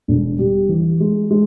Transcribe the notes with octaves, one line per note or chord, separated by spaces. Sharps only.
E1
G3
E3
G#3
G#3